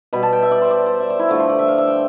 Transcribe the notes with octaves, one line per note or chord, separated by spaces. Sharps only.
B2 G3 B5
A5
G5
E5
D5
C5
D5
C5
E5
D5
E4
D3 F3 A3 C5
C5
D5
E5
F5
E5
G5